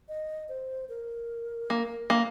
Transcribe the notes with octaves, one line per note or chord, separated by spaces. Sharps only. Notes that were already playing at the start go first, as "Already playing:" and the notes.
D#5
C5
A#4
A#3
A#3